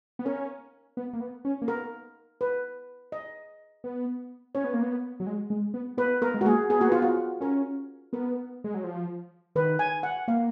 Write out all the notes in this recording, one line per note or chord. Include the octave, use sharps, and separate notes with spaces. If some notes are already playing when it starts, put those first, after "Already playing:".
B3
C#4 A#4
B3
A#3
B3
C#4
A#3
B3 A#4
B4
D#5
B3
C#4 C#5
B3
A#3
B3
F#3
G#3
G#3
B3
B3 B4
B3 A#4
G#3
F#4
A#3 G#4
B3 G#4
A#3 F#4
B3 F4
F#4
C#4 A#4
B3 A#4
G#3
F#3
F3
D#3 B4
G#5
F#5
A#3 F5